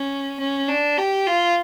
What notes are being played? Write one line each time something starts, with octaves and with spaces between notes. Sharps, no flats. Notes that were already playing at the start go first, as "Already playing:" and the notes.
Already playing: C#4
C#4
D4
G4
F4